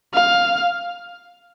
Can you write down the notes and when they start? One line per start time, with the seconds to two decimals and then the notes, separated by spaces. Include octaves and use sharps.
0.14 F5